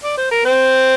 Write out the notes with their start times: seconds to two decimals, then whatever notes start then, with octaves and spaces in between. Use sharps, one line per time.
0.03 D5
0.17 C5
0.31 A#4
0.45 C4 C5